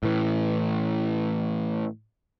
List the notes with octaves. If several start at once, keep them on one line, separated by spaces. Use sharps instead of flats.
A2 E3